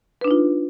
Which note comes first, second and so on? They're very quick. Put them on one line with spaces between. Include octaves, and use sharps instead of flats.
B4 D4 D#4 F4